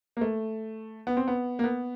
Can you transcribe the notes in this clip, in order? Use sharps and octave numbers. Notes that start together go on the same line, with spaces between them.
A#3
A3
B3
C4
B3
A#3
B3